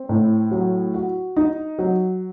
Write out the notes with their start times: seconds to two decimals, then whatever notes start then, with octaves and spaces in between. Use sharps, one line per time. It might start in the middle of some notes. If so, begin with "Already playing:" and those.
Already playing: C4
0.09 A2
0.51 F#3
0.94 F#4
1.37 D#4
1.79 F#3